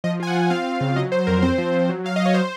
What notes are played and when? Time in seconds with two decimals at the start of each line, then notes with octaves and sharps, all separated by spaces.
0.04 F3 D#5
0.20 F4 G#5
0.27 F#5
0.35 F4
0.50 C4 F5
0.66 C4
0.81 C#3
0.96 F#3 D#5
1.12 F#3 C5
1.27 F2 A#4
1.42 C4 C5
1.58 F3
1.73 F3
1.89 F#3
2.04 F#3 F5
2.16 F#3 D#5
2.26 C#5
2.34 C5